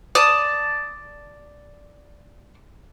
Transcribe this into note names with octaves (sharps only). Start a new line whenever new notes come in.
D5 A5 D#6